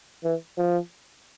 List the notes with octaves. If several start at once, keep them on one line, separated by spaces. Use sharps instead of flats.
E3
F3